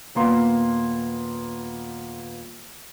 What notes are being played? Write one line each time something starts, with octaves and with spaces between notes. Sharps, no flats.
D#1 A#3 B3 C6